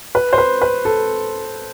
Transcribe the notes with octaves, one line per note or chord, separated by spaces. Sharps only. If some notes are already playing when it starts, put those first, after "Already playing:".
B4
C5
B4
B4
A4